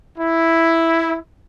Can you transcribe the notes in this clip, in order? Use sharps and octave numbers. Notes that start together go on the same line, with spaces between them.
E4